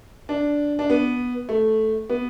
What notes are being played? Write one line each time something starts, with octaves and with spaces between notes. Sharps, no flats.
D4
D4
B3
A3
B3